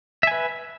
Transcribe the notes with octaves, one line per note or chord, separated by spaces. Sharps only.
B4 E5 G#5